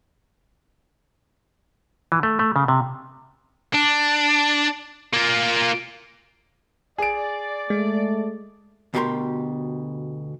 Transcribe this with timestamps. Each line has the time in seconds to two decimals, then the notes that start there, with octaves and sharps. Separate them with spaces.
2.12 E3
2.23 A3
2.39 A3
2.56 C#3
2.68 C3
3.75 D4
5.13 A#3 F4
6.98 G#4 D5 D7
7.70 G#3 A3
8.94 D2 B2 G4 G#4 A#4 C6